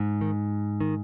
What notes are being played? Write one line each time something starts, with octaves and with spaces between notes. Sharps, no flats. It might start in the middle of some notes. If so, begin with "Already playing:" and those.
Already playing: G#2
D#3
D#3